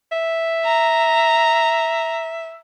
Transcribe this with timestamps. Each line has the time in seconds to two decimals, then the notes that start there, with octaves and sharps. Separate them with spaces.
0.12 E5
0.65 A#5